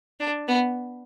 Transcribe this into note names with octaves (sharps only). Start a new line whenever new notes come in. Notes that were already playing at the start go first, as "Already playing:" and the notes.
D4
B3